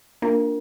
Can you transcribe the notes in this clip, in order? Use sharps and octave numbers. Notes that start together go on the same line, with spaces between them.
A#3 D4 F4 A#4